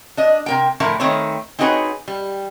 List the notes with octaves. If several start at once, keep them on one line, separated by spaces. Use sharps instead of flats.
D4 D#5
C3 A#4 G5
A2 D3 F3 E4 A#4
D#3 A3 C4 B4 C#5
C4 D#4 F#4 G#4 B4 C#5
G3